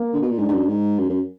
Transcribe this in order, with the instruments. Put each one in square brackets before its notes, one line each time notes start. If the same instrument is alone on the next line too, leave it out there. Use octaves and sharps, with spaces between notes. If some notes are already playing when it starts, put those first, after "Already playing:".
Already playing: [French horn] A#3
[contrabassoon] D3
B2
A#2
[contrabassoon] G#2 [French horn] D4
[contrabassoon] G#2
F#2
G#2
F#2
F#2